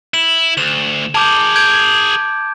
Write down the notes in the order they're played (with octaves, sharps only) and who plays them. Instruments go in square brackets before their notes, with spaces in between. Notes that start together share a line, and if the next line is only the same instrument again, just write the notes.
[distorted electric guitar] E4 [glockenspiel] E7
[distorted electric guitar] D2 [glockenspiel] E7
[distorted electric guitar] G#4 A#4 [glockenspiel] A5 D6 G6
[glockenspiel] G6 G#6 D7